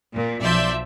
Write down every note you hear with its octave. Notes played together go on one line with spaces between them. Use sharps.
A#2
B1 F3 D5 E5 C6 G6